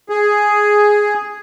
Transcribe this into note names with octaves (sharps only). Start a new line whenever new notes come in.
G#4